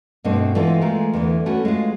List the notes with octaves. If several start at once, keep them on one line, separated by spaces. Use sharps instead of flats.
G2 B2 A3 C4 D4 D#5
E3 G#3 B3 C4 F4 A4
G#3 A3 F4 A#4
E2 D3 E3
A3 C#4 F#4 B4
G#3 F4